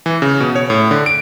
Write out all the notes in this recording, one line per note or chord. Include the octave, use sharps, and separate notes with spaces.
E3
C#3
B2
C#5
A2
D3
D7